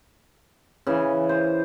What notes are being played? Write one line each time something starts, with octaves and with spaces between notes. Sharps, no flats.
C#3 E3
C5